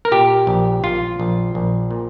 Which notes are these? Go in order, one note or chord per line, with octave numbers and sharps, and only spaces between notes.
A#4
A#2 G4
A#1
A#1 F4
A#1
A#1
A#2